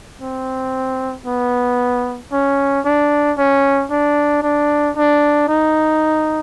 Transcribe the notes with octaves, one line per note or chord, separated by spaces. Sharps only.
C4
B3
C#4
D4
C#4
D4
D4
D4
D#4